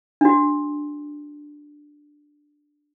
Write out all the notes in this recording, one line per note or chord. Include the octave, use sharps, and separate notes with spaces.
D4 F#4